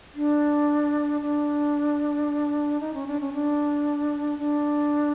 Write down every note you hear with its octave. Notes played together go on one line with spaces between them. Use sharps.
D4
D4
D#4
C#4
D4
C#4
D4
D4